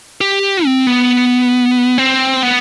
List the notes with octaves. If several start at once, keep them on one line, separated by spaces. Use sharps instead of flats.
G4
C4
B3
C4
B3